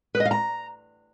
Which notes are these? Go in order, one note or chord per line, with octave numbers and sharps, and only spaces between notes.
B4
D#5
F5
A#5